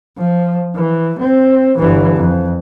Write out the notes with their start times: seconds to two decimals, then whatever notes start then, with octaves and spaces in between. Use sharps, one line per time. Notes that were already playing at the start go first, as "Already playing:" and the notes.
0.18 F3
0.75 E3
1.20 C4
1.78 G1 E3
2.16 F2